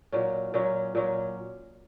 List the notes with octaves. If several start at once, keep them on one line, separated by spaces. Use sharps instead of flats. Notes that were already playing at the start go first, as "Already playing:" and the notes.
A#2 F#3 C#4
A#2 F#3 C#4
A#2 F#3 C#4